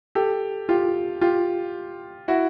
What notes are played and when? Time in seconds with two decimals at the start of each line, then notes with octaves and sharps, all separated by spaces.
0.15 G4 A4
0.69 F4 G4
1.21 F4 G4
2.28 E4 F#4